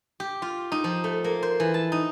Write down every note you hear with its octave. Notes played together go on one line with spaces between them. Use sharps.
G4
F4
D#4
F3
A3
A#3
C5
E3
A5
D#4